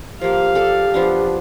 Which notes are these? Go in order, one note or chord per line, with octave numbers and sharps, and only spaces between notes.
F3 A#3 G4 F5
A4 D5
F3 B3 D4